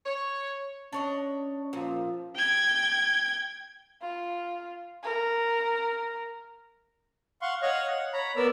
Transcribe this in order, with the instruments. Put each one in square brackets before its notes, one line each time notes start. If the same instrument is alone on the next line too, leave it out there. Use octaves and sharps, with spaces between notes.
[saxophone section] C#5
[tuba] C#4 [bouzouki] D4 C#5 D#5
[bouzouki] A#2 [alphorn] F3
[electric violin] G5 G#6
[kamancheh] F4
A#4
[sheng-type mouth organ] F5 F#5 C6 C#6
C#5 D#5 F5 F#5 C#6
F#5
C#5 A#5 B5
B3 A#4 D5 E6